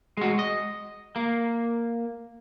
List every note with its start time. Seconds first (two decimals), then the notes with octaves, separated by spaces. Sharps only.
0.17 G#3 F#4
0.39 D#5
1.16 A#3